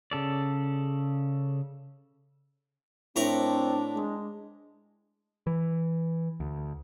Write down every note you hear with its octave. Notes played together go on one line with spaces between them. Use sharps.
C#3 A4 D5
A2 C4 D4 A#4 C#6
G#3
E3
D2